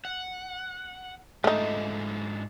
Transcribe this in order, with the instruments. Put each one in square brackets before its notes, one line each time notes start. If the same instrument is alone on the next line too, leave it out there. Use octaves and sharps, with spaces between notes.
[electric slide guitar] F#5
[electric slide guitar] G#2 D4 F4 [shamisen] A3 D#4